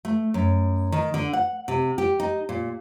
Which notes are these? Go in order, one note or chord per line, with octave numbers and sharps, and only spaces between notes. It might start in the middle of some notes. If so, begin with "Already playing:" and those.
A3
F#2
D#3
D3
F#5
C3
G4
D#4
A#2